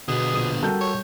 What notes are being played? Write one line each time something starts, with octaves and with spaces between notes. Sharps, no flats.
B2 D3 B3 G#4
A#1 D#6 D#7
G3 F#4 A4 A#4 G6
C#5